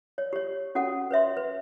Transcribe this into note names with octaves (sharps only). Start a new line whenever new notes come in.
C#5
G4 C#5
C#4 F#4 A4 F#5
B4 C#5 E5 C6
B4